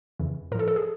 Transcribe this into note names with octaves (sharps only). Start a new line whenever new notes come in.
F2 C#3 E3
A2 F3 A4 A#4
A4
G#4